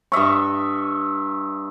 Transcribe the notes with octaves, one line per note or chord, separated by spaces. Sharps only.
G2 D#5 E5 C#6